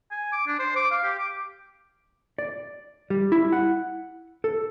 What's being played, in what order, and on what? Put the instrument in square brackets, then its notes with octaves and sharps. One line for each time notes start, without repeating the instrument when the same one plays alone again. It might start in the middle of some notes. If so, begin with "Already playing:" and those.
[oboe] G#5
D6
D4
C5
D6
F5
G4
D6
[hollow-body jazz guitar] D5
G3
E4
F#5
A4